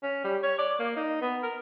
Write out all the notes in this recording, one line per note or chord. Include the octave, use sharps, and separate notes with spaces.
C#4
G3
C#5
D5
A#3
D#4
B3
A#4